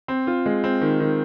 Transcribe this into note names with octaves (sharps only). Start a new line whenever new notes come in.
C4
F4
G#3
C4
D#3
D#3